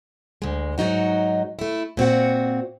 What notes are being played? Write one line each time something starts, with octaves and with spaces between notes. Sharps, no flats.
D2 G#3
G#2 F#3 D#4 F#4
A3 E4
A#2 C4 F#4 F#5